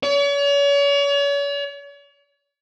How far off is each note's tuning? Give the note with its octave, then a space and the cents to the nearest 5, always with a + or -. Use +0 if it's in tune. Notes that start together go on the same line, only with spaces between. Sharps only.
C#5 +40